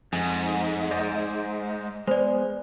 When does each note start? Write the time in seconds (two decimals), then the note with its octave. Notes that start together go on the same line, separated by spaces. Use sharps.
0.13 F2 G#2 G#5
0.91 C5 D5 D#5
2.07 G#3 B3 C5 D5